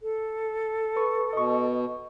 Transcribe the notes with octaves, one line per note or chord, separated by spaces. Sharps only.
A4
B4 C#6
B2 D#5 C#6